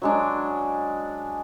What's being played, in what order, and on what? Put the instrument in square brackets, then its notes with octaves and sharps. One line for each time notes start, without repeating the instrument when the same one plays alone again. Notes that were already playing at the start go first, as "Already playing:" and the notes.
[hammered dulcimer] F#3 G#3 D4